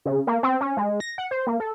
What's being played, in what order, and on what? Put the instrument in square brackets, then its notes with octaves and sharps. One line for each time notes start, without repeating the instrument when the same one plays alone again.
[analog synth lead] C#3
A#3
C4
C#4
G#3
A#6
F#5
C5
A#3
A4